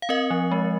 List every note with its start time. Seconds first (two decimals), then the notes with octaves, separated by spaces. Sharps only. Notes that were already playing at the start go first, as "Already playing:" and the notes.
0.02 F5
0.09 C4 A#4 D#5
0.31 F3
0.52 G#3